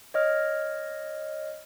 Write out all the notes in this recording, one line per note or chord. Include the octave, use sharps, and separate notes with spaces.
C#5 D#5 F6